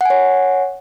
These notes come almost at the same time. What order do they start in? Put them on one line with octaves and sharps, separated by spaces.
F#5 G#5 C#5